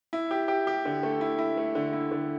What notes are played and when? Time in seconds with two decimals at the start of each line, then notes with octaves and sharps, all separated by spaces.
0.13 E4
0.31 G4
0.48 G4
0.67 G4
0.85 D3
1.03 A3
1.21 E4
1.39 E4
1.57 A3
1.75 D3
1.93 E4
2.12 D3